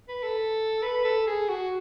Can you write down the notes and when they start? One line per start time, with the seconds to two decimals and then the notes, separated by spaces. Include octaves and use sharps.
0.08 B4
0.23 A4
0.82 B4
1.04 A4
1.27 G#4
1.49 F#4